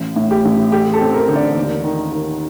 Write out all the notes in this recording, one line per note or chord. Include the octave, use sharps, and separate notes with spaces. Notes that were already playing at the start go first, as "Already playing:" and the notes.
Already playing: A1
A2
G4
A1
A3 G4
A4
C4
A#4
D3
D5
D#2
D#3
D#3